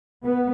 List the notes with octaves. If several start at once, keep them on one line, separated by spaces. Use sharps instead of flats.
B3